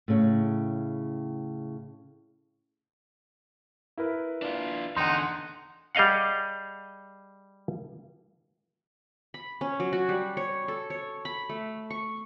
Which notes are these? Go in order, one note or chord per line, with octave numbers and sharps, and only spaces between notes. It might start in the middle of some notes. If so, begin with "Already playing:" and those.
A2 C#3
E4 A#4 B4
D4 F4
E2 D3 D#4 F#5 C6
G3 G#4 D#5 F5 F#5
B5
C#4
F#3
F#4
G3
C#5
A4
C#5
B5
A3
C#6